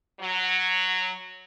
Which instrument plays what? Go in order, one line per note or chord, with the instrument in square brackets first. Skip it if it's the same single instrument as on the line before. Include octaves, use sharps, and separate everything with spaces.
[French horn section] F#3